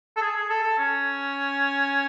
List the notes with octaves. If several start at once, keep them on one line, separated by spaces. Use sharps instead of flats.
A4
G#4
G#4
A4
A4
C#4